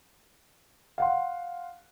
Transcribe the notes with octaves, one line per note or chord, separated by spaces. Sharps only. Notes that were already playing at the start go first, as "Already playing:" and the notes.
F5 F#5 C6